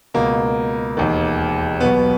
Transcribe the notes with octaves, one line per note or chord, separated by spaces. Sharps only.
C#2 B2 A#3
E1 D#2 D#3
B1 B2 B3